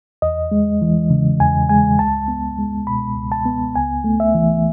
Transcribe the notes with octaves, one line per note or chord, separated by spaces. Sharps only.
E2 D#5
G#3
E3
C#3
E2 G#5
G#3 G#5
C#2 A5
B3
G#3
B2 B5
C#2
A5
B3
C#2 G#5
A3
E5
E3